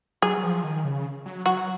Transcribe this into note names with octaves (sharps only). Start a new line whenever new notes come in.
F#3 G#4
F#3
F3
D#3
C#3
F#3
F#3 F#4